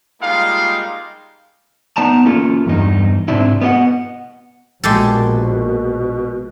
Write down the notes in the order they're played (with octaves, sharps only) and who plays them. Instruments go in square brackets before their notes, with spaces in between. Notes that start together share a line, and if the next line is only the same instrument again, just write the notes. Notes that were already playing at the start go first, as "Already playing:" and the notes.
[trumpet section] G3 G#3 A#3 D#4 F4 F5
[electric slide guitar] B3 D#4 D5 A5 A#5
A#3 C#4 E4 F4 A4
E2 G2 D#4
G#2 C3 C4 D4 E4
B3 C#4 G4 D#5 F#5
[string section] A#1 [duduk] B2 [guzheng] G#3 G4 A4